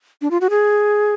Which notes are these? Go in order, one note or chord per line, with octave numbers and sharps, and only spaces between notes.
D4
F4
F#4
G#4